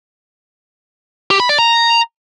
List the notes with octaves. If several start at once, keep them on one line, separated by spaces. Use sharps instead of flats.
G4
B5
D5
A#5